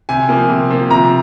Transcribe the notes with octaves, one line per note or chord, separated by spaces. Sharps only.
C3 G#5
F3 A#3
C3
F3 A#3
C3 A#5